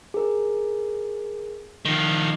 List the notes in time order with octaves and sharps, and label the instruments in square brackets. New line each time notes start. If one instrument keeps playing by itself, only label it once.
[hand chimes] G#4 A#4
[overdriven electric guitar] D#3 F3